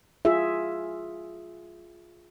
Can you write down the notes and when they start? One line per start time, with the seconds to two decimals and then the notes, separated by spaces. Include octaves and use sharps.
0.25 F4 G#4 E5